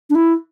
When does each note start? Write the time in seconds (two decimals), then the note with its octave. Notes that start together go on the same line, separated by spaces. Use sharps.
0.10 D4
0.15 E4